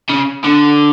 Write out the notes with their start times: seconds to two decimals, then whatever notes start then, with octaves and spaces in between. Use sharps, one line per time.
0.09 C#3
0.44 D3